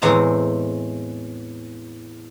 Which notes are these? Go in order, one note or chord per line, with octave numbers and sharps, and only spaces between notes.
E2 A2 G#3 C4 A#5